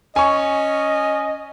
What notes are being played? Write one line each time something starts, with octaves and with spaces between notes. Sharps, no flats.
C#4 D#5 G#5 C#6